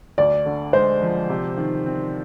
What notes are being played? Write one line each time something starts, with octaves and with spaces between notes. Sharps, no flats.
D2 D5
D3
G#3 C5
F3
C3
D#3
C4